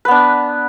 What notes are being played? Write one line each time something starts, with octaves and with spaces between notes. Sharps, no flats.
B3 D4 B4